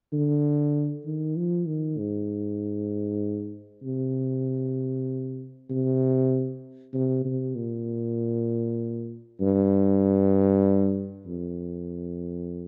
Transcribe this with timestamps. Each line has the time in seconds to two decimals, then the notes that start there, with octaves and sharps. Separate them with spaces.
0.13 D3
1.06 D#3
1.36 F3
1.67 D#3
1.98 G#2
3.83 C3
5.70 C3
6.94 C3
7.25 C3
7.55 A#2
9.40 G2
11.26 F2